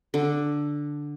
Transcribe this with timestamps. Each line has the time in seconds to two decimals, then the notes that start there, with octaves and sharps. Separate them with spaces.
0.14 D3